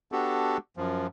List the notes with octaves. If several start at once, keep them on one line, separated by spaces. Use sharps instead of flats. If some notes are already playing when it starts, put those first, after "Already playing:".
B3 D4 F#4 G4 A4
F#2 F3